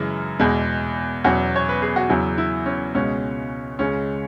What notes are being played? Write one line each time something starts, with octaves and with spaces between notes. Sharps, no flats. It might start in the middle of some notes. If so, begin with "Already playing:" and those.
Already playing: F#2 C#3 E3 G#3
E2 B2 G#3
E2 B2 F#3 C#4 F#4
C#5
B4
G#4
F#4
E2 C#3 F#3 E4
E4
C#4
C#2 B2 G#3 C#4
C#2 C#3 G#3 C#4